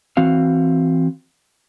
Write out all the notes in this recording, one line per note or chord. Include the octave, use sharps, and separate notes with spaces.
E3 C4 F#4 F5